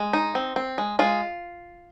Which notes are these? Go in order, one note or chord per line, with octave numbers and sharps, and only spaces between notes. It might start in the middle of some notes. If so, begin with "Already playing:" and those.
Already playing: G#3
D#4
C4
C4
G#3
G#3 F4